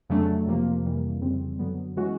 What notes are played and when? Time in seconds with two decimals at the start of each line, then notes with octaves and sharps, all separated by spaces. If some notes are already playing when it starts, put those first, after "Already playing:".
0.09 F2 C#3 F#3 A3 D4
0.46 F2 C3 F3 A#3
0.84 F2 C3 E3 G3 A#3
1.21 F2 C#3 E3 G3 C4
1.59 F#2 D3 F#3 B3
1.96 E3 G#3 C#4 F#4